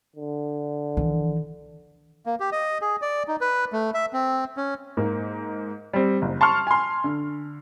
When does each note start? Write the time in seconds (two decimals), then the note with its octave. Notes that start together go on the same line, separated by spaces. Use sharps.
0.16 D3
0.97 D#3 E3
2.26 A#3
2.40 G4
2.52 D#5
2.81 G#4
3.02 D5
3.28 D#4
3.41 B4
3.72 A3
3.94 E5
4.13 C4
4.57 C#4
4.97 G#2 A#3
5.93 G3 C4
6.22 F#1
6.41 A5 C6 C#6 F6
6.67 G#5 C6
7.04 D3